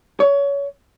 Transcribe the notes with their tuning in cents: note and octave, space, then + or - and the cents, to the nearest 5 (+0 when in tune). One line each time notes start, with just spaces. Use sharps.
C#5 +25